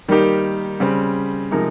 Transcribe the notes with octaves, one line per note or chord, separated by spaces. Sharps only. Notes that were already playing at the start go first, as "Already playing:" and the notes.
D#3 G3 A#3 D#4 G4
C#3 G3 C4
C3 F3 G#3 D#4 A#4